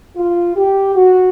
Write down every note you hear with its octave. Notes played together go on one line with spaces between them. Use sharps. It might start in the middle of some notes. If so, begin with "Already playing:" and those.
F4
G4
F#4